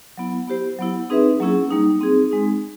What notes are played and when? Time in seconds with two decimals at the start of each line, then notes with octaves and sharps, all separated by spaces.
0.18 F#3 B3 E4
0.48 B3 E4 G4 C5
0.78 F#3 B3 E4
1.10 C4 D#4 G#4 B4 E5
1.40 F#3 A#3 C#4 E4 G#4
1.71 G3 A#3 D#4
2.01 C4 D#4 G#4
2.31 G#3 C4 D#4